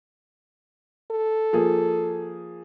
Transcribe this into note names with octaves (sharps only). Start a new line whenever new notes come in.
A4
F3 A#3 G#4